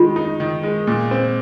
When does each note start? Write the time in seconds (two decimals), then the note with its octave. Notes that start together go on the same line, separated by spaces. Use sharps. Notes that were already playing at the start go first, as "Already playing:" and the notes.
Already playing: D#3 G#3 F4
0.16 D#4
0.40 D#3
0.63 G#3
0.87 A#2
1.11 C4